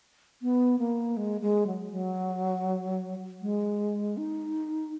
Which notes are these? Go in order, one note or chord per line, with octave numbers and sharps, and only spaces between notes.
B3
A#3
G#3
G#3
F#3
F#3
G#3
D#4